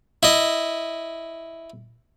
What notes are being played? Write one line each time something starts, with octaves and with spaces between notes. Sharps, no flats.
E4 D#5